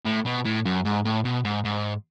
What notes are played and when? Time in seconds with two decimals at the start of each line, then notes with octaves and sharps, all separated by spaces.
0.05 A2
0.26 B2
0.45 A2
0.65 F#2
0.85 G#2
1.05 A2
1.25 B2
1.45 G#2
1.65 G#2